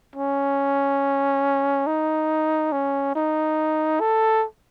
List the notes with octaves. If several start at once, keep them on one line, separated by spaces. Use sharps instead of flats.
C#4
D#4
C#4
D#4
A4